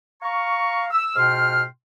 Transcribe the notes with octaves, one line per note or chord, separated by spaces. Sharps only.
F5 A#5 C#6
E6
G#2 B2 F4 G5 C6 F6